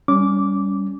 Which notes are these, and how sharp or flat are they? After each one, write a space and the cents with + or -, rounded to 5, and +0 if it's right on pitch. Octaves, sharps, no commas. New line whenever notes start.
G3 +0 C#4 +25 D6 -10